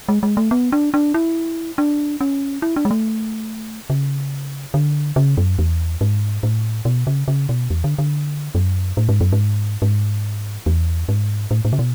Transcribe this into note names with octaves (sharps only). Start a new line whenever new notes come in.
G#3
G#3
A3
B3
D4
D4
E4
D4
C#4
E4
D4
G#3
A3
C#3
D3
C#3
F#2
E2
G#2
A2
B2
C#3
C#3
B2
E2
D3
D3
F#2
A2
G#2
F#2
G#2
G#2
E2
G#2
A2
A2
C#3
B2